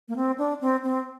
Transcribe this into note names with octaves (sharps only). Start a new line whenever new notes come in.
A#3
C4
D4
C4
C4